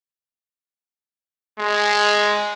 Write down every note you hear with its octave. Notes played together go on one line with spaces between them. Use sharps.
G#3